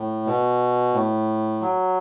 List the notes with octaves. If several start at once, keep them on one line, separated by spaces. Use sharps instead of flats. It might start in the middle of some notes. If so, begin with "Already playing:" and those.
Already playing: A2
B2
A2
F#3